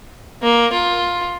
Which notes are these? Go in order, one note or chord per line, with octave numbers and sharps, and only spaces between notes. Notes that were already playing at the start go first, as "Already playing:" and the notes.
A#3
F4